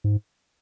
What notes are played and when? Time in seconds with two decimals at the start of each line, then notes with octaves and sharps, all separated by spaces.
0.04 G#2